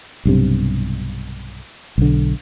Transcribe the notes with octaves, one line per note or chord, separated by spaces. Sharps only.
B1 G2 C3
B1 D3